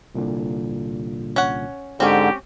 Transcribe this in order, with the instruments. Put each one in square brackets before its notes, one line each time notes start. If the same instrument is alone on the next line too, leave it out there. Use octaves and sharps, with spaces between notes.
[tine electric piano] C2 A#2 D3
[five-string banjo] C#4 F#5
[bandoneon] G#2 D3 [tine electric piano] G#3 [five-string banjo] C4 C#4 [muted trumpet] G4